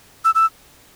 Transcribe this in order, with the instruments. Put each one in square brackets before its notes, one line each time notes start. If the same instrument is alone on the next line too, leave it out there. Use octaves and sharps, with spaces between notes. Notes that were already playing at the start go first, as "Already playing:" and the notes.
[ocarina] E6
E6